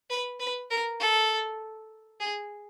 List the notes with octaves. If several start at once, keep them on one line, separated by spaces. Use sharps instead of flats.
B4
B4
A#4
A4
G#4